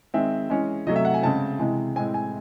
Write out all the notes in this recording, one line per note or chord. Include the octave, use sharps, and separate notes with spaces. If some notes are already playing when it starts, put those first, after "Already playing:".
D#3 G#3 C4 E5
E3 G#3 C#4
C3 F#3 A3 D#5
E5
F#5
G#5
C#3 G#3 C4 A5
C3 E3 G#3
A2 G#3 C4 G#5
G#5